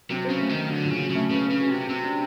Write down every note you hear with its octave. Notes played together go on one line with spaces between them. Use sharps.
C3 F#3
C#3 C4
A3
D#3
A3
D3 F#3
A#2
C#3
F#3
C#3 A3
C#3 B3
B3
C#3
F#4
C3 F#4
C3 F#4
D4